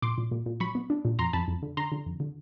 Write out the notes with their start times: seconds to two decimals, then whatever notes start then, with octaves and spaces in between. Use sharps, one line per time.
0.02 A#2 C6 D6
0.18 A#2
0.31 A#2
0.46 A#2
0.60 F#3 B5 C#6
0.75 B3
0.90 D4
1.05 A#2
1.19 F2 A#5 C6
1.33 F2 A5 B5
1.48 F2
1.62 D3
1.77 D3 A#5 C6
1.92 D3
2.06 F2
2.20 D3